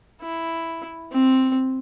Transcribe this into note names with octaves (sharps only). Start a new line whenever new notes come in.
E4
C4